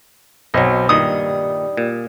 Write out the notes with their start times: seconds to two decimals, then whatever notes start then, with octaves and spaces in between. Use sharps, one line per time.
0.54 B1 F#3 C4 D#5
0.89 G2 A#2 D#3 G3 D#6
1.77 A#2